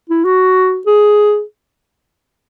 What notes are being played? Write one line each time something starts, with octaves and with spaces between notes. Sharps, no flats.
E4
F#4
G#4